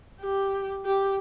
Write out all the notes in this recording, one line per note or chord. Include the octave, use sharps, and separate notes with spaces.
G4
G4